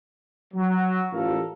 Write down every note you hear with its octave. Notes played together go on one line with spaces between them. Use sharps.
F#3
A1 F4 G4 A4 A#4 F5